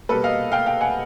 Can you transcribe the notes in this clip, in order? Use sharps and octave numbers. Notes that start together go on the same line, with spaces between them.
B2 G3 A#3 A4 B4
D#5 F5
F5 G5
F5 G5
F#5 G#5